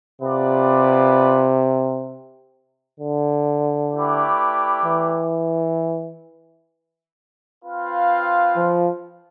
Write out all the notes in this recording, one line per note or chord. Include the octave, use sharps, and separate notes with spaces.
C3 B3 F4 B4 D5
D3
A3 E4 G4 B4 D5
E3
C4 F4 B4 F5
F3